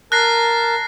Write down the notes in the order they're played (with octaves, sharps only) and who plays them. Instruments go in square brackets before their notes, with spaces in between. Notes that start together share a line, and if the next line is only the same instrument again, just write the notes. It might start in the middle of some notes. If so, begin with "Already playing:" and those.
[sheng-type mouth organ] A#4 A5 [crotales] F#6 A#6 C7